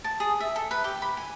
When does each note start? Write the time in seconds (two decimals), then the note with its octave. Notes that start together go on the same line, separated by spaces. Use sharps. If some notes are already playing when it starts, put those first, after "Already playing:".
0.04 A5
0.20 G#4
0.40 E5
0.56 A4
0.71 B4
0.84 G4
1.02 B5
1.17 G#5